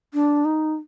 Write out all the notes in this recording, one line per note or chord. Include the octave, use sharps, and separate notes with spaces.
D4
D#4